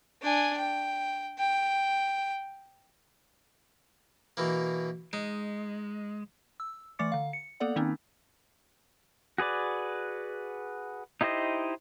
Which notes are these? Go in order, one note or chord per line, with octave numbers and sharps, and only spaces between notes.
D4 G#5
G5
G5
B2 E3 A#3
G#3 D#4
E6
E3 A3 D5 D6 A6 C#7
D3 F5
C#7
A#3 B3 A4 D5 F#5
D#3 A#3 C4 C#4 D#4
F#4 G#4 B4 D5
D#4 E4 G4 C5 D#5